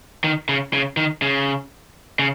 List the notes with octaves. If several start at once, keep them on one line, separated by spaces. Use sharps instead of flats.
D#3
C#3
C#3
D#3
C#3
C#3